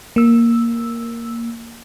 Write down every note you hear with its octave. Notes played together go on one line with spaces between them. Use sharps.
A#3 E6